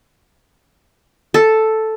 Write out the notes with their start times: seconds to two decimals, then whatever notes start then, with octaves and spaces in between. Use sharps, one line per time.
1.34 A4